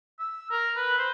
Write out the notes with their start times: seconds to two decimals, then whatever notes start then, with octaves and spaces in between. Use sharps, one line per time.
0.19 E6
0.51 A#4
0.76 B4
0.98 C5